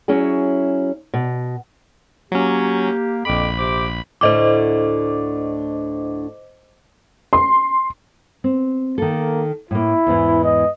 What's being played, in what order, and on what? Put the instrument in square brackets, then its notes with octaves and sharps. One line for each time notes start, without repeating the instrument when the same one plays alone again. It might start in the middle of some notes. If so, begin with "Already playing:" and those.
[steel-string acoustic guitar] F#3 C#4 E4 G#4
B2
[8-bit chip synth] F#3 C#4 [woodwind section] A#3 G4
[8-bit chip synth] A#1 B5 [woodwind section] F2 D6
[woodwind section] C3 C5 D6
[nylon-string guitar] D2 A2 D3 [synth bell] C5 D#5 D6
[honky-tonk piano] C6
[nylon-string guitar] C4
[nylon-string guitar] D#3 A4 [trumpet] A#3
[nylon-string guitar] A2 A#3 [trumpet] E4
[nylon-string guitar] E2 G#2 E3
[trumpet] D#5